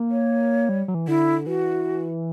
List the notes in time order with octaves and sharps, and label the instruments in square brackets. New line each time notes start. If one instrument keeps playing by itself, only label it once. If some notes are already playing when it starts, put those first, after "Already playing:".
Already playing: [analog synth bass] A#3
[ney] C#5
[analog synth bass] G3
F#3
E3
[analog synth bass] D3 [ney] E4
[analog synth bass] E3 [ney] F#4